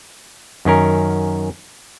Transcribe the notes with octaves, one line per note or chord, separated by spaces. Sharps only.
F#2 D#3 C#4 A#4